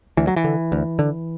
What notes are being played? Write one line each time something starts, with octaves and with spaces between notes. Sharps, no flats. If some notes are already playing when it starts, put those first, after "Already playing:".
D2 E3
F#3
E3
D3
D2
D3